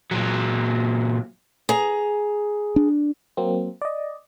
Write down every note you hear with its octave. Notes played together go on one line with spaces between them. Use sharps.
A#2 F#3
G#4 A#5
D4
F#3 A#3 C4
D5 D#5